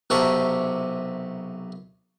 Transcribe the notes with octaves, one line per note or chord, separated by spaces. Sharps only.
B1 C3 A#4 E5 A5 C#6